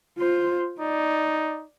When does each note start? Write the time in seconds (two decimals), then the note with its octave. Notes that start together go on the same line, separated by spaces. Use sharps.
0.18 F4 C5
0.80 D#4 D5